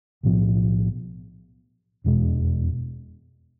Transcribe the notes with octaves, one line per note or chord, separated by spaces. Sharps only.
B1 A2 F3 B3
F1 E2 B2 G#3